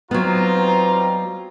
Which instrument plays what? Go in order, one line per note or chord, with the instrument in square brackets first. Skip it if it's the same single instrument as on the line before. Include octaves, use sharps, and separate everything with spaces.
[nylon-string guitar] F#3 B3 [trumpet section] G3 A#5 [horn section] C4 D#4 F4